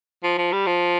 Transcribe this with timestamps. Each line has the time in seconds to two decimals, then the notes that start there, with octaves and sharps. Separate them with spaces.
0.23 F3
0.38 F3
0.52 G3
0.67 F3